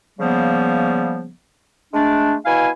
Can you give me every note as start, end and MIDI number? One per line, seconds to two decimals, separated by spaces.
0.19 1.30 49
0.19 1.30 53
0.19 1.30 55
0.19 1.30 58
0.19 1.30 59
1.94 2.35 56
1.94 2.35 57
1.94 2.35 62
2.46 2.69 47
2.46 2.69 64
2.46 2.69 77
2.46 2.69 80